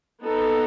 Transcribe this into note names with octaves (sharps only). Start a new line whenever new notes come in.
B3 D#4 A4